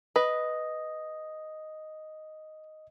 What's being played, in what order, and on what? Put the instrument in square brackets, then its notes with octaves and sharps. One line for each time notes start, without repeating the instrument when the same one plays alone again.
[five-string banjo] B4 [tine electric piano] D#5